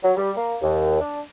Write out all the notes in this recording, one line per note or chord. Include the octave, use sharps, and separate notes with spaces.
F#3
G3
A#3
D#2
D4